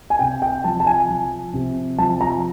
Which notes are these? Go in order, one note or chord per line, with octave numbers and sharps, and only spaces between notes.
G#5
C3 G5
G5
F3 A5
A5
G#5
F3
C3
F3 A5
A#5